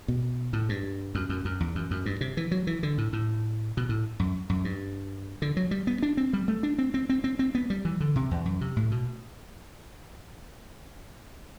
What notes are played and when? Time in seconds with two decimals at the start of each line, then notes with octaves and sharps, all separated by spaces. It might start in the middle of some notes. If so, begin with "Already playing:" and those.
0.08 B2
0.53 A2
0.69 G2
1.15 F#2
1.29 F#2
1.45 F#2
1.60 E2
1.75 F#2
1.91 F#2
2.06 G2
2.21 C3
2.37 E3
2.51 F#3
2.67 E3
2.83 D3
2.98 A2
3.13 A2
3.77 B2
3.89 A2
4.20 F#2
4.50 F#2
4.65 G2
5.42 D3
5.57 F#3
5.71 G3
5.87 B3
6.03 D4
6.17 C4
6.33 G3
6.48 A3
6.63 D4
6.78 C4
6.94 C4
7.09 C4
7.24 C4
7.39 C4
7.55 B3
7.70 G3
7.85 E3
8.00 D3
8.16 C3
8.31 E2
8.46 F#2
8.61 C3
8.76 A2
8.91 B2